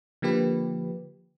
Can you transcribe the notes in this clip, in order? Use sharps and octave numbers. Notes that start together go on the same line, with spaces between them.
D3 F3 A#3 G4 B4